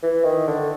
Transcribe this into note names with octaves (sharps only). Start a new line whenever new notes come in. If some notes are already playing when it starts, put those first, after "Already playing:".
E3
D#3
D3